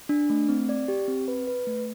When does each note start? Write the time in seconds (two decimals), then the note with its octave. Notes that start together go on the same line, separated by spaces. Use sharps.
0.09 D4
0.30 A3
0.49 C4
0.69 D5
0.88 G4
1.08 C4
1.28 B4
1.47 B4
1.67 A3